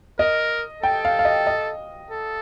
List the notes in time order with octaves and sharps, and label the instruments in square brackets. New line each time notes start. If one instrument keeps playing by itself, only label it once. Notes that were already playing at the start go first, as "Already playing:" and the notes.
[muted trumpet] A#4 [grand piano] D#5
[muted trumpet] A4 [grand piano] G5
[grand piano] F5
F5
D#5
D#5
[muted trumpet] A4